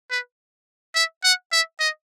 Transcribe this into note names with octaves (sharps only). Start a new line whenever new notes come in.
B4
E5
F#5
E5
D#5